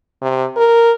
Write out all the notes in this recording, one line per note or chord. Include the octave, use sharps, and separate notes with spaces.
C3
A#4